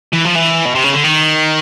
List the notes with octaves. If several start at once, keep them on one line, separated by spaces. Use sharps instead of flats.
E3
F3
E3
B2
C3
C#3
D3
D#3